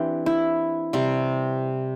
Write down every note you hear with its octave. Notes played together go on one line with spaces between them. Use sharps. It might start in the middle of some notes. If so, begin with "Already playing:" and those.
Already playing: E3 C4 D4 G4
E4
C3 G3 C4